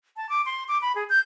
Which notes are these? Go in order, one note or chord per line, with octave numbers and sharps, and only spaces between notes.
A5
D6
C6
D6
B5
G#4
G6